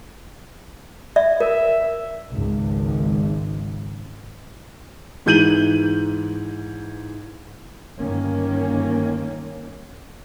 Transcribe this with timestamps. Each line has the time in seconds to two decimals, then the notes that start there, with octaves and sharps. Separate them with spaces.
1.16 D5 E5
1.40 A#4 E5
2.32 G#1 C#2
5.26 G#2 E3 G6 D#7 F#7
7.99 G1 D#3 A#3 C#4